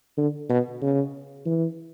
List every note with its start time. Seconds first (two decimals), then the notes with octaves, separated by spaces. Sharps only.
0.17 D3
0.50 B2
0.82 C#3
1.46 E3